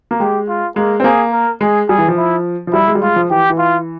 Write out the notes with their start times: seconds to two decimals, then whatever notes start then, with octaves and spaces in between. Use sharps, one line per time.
0.11 A#3
0.20 G#3 G4
0.48 F4
0.76 G#3 A#3
1.00 C4
1.04 A#3 G#4
1.32 A#4
1.61 G#3 G#4
1.89 G3 G#4
1.98 E3
2.08 F3
2.17 E4
2.67 F3
2.73 G3 E4
2.88 G#3
2.95 G3
3.02 G#3 F4
3.16 F3
3.30 E3 G4
3.50 E3
3.58 F4